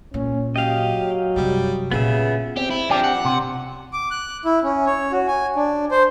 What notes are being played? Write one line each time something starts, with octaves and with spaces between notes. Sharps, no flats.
A#2 C#4
F#3 G4 D#5 F5
F#2 C3 G3
A#2 C#3 B3 F4 E5
C4 G4
E4
F3 C4 D4 G4
F#5
C3
D6
F#6
E4
C#4
C#5
F#4
G#5
D4
C5